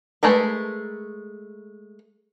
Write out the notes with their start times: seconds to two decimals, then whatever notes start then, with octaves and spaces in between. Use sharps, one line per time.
0.23 G#3 A3 A#4 B4